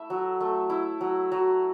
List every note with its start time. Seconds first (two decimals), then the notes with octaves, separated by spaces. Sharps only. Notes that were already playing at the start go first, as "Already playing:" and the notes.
Already playing: A3 E4 E5
0.10 F#3
0.40 A3
0.70 E4
1.01 F#3
1.32 F#3